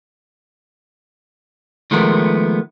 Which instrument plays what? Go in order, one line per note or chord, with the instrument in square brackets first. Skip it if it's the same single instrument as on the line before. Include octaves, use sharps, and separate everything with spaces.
[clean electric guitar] D#3 F3 G#3 A3 B3 A#4